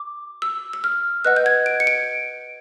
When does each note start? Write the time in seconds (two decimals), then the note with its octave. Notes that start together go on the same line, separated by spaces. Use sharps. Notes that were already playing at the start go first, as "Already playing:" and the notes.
Already playing: D6
0.42 E6
0.73 E6
0.84 F6
1.25 B4 D#5 F#5 F#6
1.36 G6
1.46 G#6
1.66 D7
1.80 C#7
1.87 D7